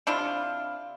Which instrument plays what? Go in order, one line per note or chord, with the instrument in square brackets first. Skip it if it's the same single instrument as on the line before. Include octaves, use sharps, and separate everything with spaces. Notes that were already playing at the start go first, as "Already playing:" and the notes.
[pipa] C3 D4 E4 F4